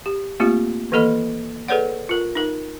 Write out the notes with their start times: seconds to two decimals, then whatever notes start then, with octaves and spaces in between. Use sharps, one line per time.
0.06 G4
0.40 A3 A#3 C4 F4 G4
0.92 D#3 E3 A#3 A4 D#5 B5
1.68 G#4 A4 B4 C#5 D5 F#5
2.09 F4 A#4
2.35 D#4 A#4